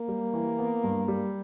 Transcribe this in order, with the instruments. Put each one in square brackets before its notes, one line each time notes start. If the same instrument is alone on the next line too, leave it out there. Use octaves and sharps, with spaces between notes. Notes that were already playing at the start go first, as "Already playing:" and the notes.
Already playing: [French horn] A#3
[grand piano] G3
E3
B3
G2
G3